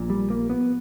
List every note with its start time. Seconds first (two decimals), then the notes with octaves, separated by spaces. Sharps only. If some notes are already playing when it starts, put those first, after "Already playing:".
Already playing: A#1 A#2
0.10 G3
0.30 A#3
0.50 B3